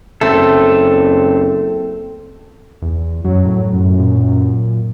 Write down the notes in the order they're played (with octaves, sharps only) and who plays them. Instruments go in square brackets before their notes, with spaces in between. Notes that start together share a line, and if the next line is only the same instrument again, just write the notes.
[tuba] F#1 [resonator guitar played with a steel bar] A3 [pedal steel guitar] C4 A4
[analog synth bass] E2
[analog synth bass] F#2 [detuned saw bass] F#3
[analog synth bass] A2
[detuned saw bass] F#2
[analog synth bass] A#2